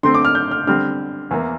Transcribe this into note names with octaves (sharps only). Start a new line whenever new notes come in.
D3 A3 C4 C6
D6
F6
G6
F6
D3 G3 C4 F6
E2 E3 A#3